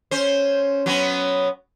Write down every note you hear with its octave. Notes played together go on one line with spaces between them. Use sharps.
C#4 C5
F#3 B3 C#4